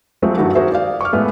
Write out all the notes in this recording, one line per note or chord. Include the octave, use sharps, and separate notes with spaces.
F3 F#3 G#3 A3 C4 F#4
G2 D#3 F#3 A3 E4 F#4
F#4 G#4 A#4 C5 E5
D5 F5
C#6 D6 F6
A2 G#3 A3 B3